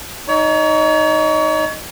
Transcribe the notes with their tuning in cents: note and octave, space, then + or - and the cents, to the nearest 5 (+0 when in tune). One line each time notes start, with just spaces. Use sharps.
D#4 +0 C#5 +35